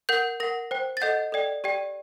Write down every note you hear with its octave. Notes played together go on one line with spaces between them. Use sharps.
A#4 F#5 G6
A#4 F#5 A#6
C5 G5
A6
A4 D#5 F#5 G6
A4 D5 G5
G4 D5 G5